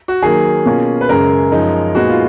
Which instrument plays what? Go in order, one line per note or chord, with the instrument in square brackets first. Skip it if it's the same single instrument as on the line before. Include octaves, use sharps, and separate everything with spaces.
[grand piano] F#4
D#3 F#3 A#3 G#4
B2 A#3 C#4 F4
B4
F#2 C#3 G#3 A#4
F#2 F3 G#3 D#4
A#2 G#3 B3 D#4 F#4
F4